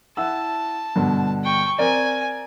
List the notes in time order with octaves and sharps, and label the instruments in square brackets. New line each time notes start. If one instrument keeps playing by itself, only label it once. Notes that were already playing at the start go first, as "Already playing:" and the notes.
[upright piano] E4 F#5 E6 [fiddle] A5
[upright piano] G2 B2 D3
[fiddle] G5 C#6
[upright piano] C4 A#4 D5 [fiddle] G#5